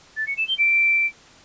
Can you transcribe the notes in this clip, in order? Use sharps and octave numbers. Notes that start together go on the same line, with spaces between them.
A6
C#7
E7
G7
D7